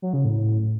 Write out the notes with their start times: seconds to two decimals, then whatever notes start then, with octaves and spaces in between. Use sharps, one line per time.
0.02 F#3
0.13 C#3
0.25 A2